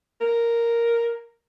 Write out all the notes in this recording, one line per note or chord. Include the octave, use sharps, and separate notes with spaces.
A#4